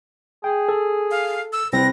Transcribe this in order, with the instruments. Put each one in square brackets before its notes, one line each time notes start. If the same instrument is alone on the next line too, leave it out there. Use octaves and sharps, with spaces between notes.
[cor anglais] G#4 [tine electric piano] G5
[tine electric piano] A4
[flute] F5
E6
[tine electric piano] C2 C4 [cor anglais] B4 [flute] A#6